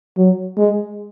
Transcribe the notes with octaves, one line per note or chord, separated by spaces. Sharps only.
F#3
G#3